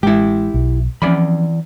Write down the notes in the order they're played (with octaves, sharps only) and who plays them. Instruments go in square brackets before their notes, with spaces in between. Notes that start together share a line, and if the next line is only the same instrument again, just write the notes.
[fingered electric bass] A1 G#3 [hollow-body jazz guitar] E4 G4
[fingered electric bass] B1
[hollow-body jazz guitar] E3 D5 B5 [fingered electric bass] F3 C#4